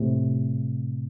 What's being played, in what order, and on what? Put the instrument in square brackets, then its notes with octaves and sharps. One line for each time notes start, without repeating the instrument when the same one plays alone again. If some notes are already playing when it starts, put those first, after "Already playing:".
Already playing: [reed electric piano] A2 C3